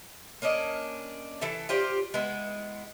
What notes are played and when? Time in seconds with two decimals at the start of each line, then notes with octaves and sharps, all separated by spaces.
0.42 A#3 C#4 D4 D#5
1.41 E3 A4 E5
1.69 F4 G4 C5 D5
2.14 G#3 B3 E4